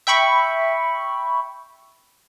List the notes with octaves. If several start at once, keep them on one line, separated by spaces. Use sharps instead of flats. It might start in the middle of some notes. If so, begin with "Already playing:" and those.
E5 G5 B5 C#6